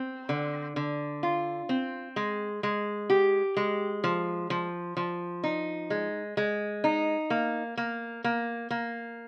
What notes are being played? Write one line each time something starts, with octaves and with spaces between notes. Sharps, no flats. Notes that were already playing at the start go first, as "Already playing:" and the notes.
Already playing: C4
D3
D3
F4
C4
G#3
G#3
G4
G#3
F3
F3
F3
D#4
G#3
G#3
D#4
A#3
A#3
A#3
A#3